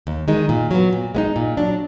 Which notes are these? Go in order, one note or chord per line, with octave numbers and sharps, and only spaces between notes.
D#2
D#3 G#3 D#4
A#2
F#3 B3
A#2
G#3 B3 D#4
A#2
F#3 D4